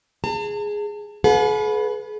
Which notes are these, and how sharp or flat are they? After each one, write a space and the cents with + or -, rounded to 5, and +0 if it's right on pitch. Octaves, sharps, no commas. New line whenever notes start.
G#4 +0 A5 +40
G#4 +45 B4 -5 F#5 -45